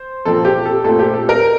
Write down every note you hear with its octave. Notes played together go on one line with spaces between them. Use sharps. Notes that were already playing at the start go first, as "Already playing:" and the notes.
Already playing: C5
A#2 F3 C4 A4
G4
A4
A#2 A3 C4 A4
G4
A4
A#4